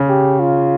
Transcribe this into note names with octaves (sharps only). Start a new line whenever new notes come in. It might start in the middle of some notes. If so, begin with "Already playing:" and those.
Already playing: C#3
G4
F4